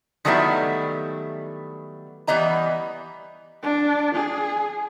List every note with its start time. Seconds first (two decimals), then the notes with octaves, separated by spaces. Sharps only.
0.25 D#3 F#3 G3 A3 B3 E4
2.27 E3 G3 B3 D#5 A#5
3.63 D4
4.16 G#4